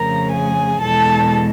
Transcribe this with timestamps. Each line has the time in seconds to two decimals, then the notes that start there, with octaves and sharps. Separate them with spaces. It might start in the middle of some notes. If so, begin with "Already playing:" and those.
Already playing: F2 C#3 F3 A3 A#4 A#5
0.33 G#4 G#5
0.82 E2 B2 G#3 A4 A5